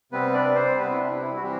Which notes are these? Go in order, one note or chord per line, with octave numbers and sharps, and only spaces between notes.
C3 G3 B3 C4 B4
D4 D5
C4 C5
C3 G3 B3 C4 B4
E4
D4
E4
F#4
E3 G3 C4 G4